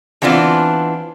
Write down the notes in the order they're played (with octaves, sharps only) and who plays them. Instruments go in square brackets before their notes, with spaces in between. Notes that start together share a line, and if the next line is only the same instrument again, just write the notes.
[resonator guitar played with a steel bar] E3 B3 C4 D4 F4